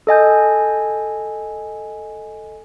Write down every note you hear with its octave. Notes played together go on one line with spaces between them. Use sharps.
A4 D#5 G#5 G6